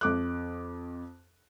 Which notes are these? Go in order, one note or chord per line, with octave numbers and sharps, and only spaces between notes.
F2 D6 F#6